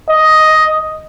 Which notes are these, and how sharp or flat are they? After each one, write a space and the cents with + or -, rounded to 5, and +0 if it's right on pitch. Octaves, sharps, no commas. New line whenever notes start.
D#5 +5